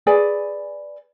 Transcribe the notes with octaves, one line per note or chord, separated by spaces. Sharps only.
G#4 B4 D5 G#5